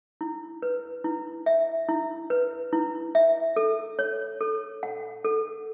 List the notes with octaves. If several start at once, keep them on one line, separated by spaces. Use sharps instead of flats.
E4
B4
E4
E5
E4
B4
E4
E5
A4
C#5
A4
F#5
A4